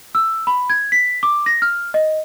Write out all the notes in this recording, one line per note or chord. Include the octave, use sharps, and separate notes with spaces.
E6
B5
G#6
B6
D6
A#6
F6
D#5